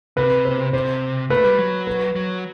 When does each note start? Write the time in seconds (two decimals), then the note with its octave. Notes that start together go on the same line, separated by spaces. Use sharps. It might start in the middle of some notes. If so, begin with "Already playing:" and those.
0.17 C3 B4
0.45 C5
0.73 C3 C5
1.30 A3 B4
1.44 G3
1.58 F#3
1.87 B4
2.16 F#3